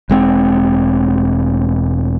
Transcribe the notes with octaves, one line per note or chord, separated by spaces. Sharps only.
E1 G#3 C4